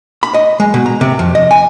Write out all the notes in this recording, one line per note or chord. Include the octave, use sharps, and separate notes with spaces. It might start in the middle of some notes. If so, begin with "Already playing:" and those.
B5
D#5
G#3
B2
A#5
C3
F2
D#5
G#5